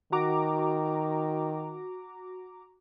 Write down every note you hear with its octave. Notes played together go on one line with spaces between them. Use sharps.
D#3 F#4 A#5 D6